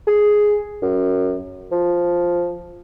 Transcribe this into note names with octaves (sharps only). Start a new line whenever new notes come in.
G#4
F#2
F3